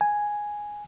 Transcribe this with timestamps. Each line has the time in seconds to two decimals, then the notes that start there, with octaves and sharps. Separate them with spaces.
0.01 G#5